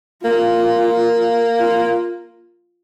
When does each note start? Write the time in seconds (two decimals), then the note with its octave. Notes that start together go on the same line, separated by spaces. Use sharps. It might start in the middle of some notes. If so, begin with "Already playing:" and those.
0.25 A#3 F4
1.60 F4